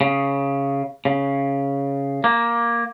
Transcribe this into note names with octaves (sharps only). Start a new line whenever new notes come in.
C#3
C#3
A#3